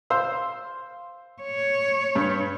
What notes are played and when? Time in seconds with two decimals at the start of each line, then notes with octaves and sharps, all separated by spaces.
0.10 C5 F5 E6
1.42 C#5
2.15 G2